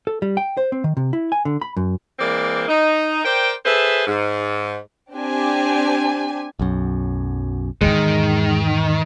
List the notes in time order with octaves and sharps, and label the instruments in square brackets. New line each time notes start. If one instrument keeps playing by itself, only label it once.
[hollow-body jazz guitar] A4
G3
G5
C5
C4
D#3
C3
E4
G#5
D3
B5
F#2
[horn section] E3 G#3 A#3 C4 D5
D#4
A#4 C5 D5 G5
G#4 A4 B4 C5 E5
G#2
[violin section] C4 D4 G4 G#5
[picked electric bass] B1 F#2
[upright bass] E2 G#2 [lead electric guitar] D#3 [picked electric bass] G#3